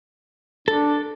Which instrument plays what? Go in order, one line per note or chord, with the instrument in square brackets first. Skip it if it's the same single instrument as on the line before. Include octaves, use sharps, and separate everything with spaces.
[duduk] D4 [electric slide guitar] A4